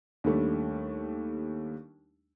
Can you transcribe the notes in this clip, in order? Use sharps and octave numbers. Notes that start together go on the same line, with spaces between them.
D#2 G3 A3 D4